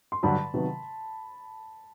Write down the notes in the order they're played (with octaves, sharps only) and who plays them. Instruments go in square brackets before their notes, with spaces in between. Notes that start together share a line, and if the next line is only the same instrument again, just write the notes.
[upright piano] C6
[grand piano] G2 D3 F#3 [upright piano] A5 B5
[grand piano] C3 D#3 F#3 B3